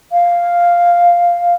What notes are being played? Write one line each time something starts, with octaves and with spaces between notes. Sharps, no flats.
F5